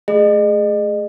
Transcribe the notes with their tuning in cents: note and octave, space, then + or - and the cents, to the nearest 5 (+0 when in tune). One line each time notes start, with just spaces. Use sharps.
A3 -20 G#4 +0 D#5 -35